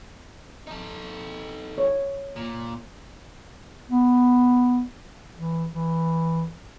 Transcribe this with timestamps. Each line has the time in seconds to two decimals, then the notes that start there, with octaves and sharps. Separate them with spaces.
0.67 D#4 A4
1.78 C#5
2.36 A#2
3.90 B3
5.36 E3
5.73 E3